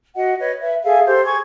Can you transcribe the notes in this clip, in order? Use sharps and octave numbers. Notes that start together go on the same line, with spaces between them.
F#4 D#5 F#5
B4 C#5 D#5
B4 E5
G#4 A4 E5 F5
G4 A4 C5
G#4 C#6 G#6